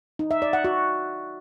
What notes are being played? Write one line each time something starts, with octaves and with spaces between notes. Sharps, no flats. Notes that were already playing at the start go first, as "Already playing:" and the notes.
D#4
E5
D5
F#5
F#4